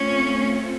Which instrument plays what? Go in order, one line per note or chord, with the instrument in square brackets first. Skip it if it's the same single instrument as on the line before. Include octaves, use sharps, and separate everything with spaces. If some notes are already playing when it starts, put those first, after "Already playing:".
Already playing: [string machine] A3 C4 F4 [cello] C#4